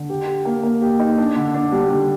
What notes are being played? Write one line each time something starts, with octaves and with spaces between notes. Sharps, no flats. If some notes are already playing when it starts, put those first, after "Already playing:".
Already playing: D3
G4
G4
A#3
A#3
G4
D#4
D4
D3
D4
G3
D3